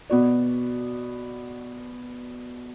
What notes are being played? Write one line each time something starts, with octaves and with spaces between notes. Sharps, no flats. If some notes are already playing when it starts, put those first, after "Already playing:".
B2 B3 F#4 D5